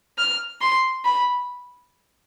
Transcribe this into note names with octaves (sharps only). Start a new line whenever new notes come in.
F6
C6
B5